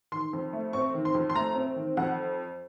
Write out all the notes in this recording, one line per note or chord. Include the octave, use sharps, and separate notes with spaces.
D#3 C6
F2
A3
C4 C#6
D#3
C6
F2
C6
A3 A#5
C4
D#3
F2 F#5